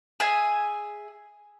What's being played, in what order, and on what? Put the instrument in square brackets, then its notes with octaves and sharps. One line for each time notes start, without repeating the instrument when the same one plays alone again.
[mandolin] G#4 E5 G#5